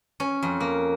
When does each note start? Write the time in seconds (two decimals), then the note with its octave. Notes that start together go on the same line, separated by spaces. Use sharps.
0.20 C#4
0.43 F2
0.60 A#3